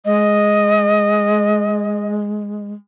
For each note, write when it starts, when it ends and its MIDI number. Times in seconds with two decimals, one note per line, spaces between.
0.05 2.73 56
0.05 2.12 75